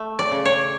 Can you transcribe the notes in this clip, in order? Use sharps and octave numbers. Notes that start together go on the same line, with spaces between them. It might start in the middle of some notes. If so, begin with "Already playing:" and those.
Already playing: A3
D5
C#3
C#5